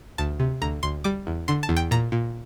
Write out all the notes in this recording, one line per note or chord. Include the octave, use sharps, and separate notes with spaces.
D2 A5
C3
D2 A#5
D2 C6
G3 D6
E2
D3 C6
A5
E2
G5
A#2 A#5
A#2